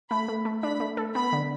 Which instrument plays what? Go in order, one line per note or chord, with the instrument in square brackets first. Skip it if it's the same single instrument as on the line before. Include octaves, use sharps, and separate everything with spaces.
[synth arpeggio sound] A3 [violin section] B5
[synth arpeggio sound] A3
A3
[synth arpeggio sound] D4 [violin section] B5
[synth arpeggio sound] A3
A4
[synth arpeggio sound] B3 [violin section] B5
[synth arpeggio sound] D3